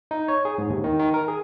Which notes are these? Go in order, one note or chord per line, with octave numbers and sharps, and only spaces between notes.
D#4
C#5
G#4
G#2
D#2
D#3
D#3
A#4
G#4